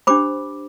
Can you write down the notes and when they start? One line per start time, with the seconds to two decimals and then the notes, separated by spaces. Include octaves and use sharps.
0.07 D4 G4 C5 B5 D6